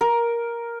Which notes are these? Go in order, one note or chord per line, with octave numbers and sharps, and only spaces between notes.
A#4